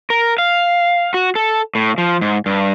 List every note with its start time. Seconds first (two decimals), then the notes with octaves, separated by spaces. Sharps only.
0.10 A#4
0.38 F5
1.14 F#4
1.35 A4
1.75 A2
1.98 F3
2.21 G#2
2.46 G2